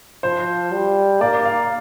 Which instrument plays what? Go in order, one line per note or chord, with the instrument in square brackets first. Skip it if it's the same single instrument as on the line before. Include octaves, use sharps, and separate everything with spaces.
[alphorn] F3 [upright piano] C5
[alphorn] G3
[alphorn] A#3 [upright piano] D5
[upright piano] F5